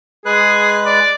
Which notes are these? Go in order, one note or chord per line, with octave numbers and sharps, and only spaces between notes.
G#3 G#4 B4 F#6
D5